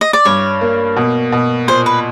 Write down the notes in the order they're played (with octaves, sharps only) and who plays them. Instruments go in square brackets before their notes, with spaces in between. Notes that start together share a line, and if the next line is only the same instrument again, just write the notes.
[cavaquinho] D#5
D5
[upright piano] G2 [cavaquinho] C#5
[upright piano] A#3
B2
B2
[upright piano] A#2 [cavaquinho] C5
[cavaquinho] B4